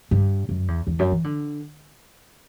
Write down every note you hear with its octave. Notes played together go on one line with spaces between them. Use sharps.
G2
F#2
E2
E2
F#2
E3
D3